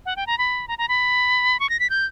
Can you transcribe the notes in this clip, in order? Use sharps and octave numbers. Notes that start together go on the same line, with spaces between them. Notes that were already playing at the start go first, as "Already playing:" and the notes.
F#5
G5
A#5
B5
A#5
A#5
B5
C#6
A#6
B6
G6